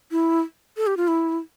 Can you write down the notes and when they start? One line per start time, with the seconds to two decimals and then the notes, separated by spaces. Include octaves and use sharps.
0.11 E4
0.77 A4
0.87 G4
0.97 F4
1.08 E4